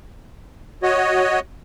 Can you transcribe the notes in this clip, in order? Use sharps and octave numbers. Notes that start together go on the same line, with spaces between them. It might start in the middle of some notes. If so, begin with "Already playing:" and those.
F#4 C#5 D#5